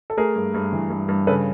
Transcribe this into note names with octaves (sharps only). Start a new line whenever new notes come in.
A4
A3 G#4 A#4
G2
G2
E3
G2
G2
C#3 A4 B4